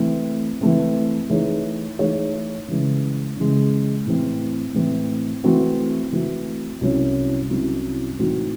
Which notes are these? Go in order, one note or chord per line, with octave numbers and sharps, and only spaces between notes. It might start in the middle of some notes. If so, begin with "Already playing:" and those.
Already playing: E3 A3 C4
E3 A3 C4
E3 A3 D#4 G#4 C#5
E3 A3 D#4 G#4 C#5
C#3 E3 G#3
C#3 E3 G#3
A2 E3 C4
A2 E3 C4
E3 A3 C4 F#4
E3 A3 C4 F#4
C2 C3 F#3 C#4 E4
C2 C3 F#3 C#4 E4
A2 E3 C4 D#4 F#4